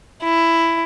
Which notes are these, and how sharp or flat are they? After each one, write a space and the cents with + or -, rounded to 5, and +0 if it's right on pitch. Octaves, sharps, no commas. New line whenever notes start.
E4 +10